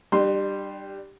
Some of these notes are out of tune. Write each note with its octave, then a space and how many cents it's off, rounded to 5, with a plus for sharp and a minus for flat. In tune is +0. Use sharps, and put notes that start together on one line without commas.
G3 +0 D4 +40 C6 +0